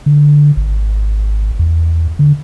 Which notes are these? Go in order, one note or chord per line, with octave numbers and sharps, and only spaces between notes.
D3
G#1
E2
D3